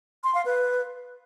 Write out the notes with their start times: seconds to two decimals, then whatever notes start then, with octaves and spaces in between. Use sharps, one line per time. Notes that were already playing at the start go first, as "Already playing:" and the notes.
0.24 C6
0.35 F5
0.45 B4